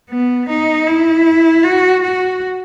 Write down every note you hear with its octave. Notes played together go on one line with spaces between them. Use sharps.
B3
D#4
E4
F#4
F#4